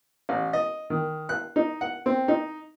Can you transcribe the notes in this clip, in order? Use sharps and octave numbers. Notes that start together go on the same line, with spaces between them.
A1
D#5
D#3
F#6
D#4
F#5
C4
D#4